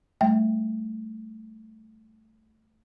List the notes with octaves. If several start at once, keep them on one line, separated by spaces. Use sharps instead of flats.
G3 A3 E5 G5